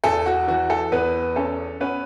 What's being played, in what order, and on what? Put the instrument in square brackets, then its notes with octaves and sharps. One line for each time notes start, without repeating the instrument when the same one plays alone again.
[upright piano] E2 A4
F#4
E3 F#4
A4
E2 B3 B4
C#4 A4
B3 C#4 B4